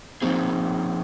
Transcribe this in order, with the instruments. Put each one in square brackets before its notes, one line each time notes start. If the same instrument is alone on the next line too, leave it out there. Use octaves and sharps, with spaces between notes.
[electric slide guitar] F3 A#3 D#4 G#4 [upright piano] C4